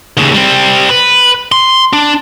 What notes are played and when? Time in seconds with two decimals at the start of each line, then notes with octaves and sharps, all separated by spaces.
0.17 D#2 C#3
0.34 G3 C4
0.89 B4
1.52 C6
1.93 D4